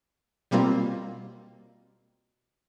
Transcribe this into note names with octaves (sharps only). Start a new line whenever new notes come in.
B2 G3 A#3 C4 F4